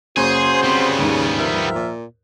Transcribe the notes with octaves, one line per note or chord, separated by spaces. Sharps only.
F#1 C#3 F#4 G#4 C5
G3 B3 C4
D#2 G#2
F3 A#4 E5
A#2